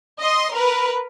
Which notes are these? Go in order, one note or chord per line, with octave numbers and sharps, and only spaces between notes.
D#5 C6
A#4 B4